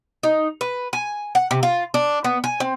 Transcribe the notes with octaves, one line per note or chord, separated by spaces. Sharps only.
D#4
B4
G#5
F#5
C3
F4
D4
B3
G#5
C4